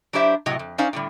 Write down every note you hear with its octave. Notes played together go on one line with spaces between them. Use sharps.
F#3 D4 E4 G4 C5 E5
A2 C3 F#3 D#5
F2
C#4 D#4 C5 D5 F5
A2 D3 G3